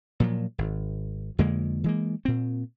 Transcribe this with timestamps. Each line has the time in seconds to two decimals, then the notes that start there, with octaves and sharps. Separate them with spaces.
0.20 A#2 F3 F#3
0.58 G#1
1.39 F2 D3 G#3 A#3
1.84 E3 G#3 A#3
2.25 A#2 C4